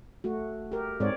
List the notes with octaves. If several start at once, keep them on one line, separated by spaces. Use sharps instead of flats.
A3 F#4
G4 A#4
G#2 C4 C#5 D5